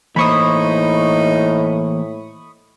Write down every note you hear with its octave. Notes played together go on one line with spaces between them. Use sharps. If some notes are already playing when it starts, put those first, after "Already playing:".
A2 E3 A#3 D#4 C5 B5 C#6 D#6